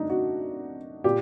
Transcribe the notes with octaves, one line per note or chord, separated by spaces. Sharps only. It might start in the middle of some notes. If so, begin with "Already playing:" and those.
Already playing: F#2 A3 D4 D#4
F#4
A#2 G4